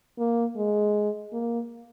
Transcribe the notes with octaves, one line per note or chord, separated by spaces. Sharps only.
A#3
G#3
A#3